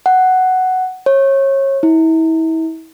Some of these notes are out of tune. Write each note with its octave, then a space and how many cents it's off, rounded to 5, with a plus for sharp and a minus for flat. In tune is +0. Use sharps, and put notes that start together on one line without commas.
F#5 +5
C#5 -30
E4 -35